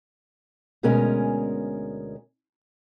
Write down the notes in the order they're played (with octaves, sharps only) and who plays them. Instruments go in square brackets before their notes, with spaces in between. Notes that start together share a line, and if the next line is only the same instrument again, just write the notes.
[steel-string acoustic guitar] D2 B2 G#3 C#4 A#4 G#5